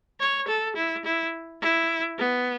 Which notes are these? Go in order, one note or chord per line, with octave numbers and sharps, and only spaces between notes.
C#5
A4
E4
E4
E4
B3